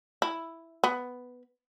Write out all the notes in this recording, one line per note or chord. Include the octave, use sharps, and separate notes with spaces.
E4
B3